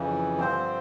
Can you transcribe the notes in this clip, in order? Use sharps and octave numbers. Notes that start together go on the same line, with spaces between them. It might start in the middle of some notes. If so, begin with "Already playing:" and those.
Already playing: F2 C#3 E3
G2 D3 F3 C4 C5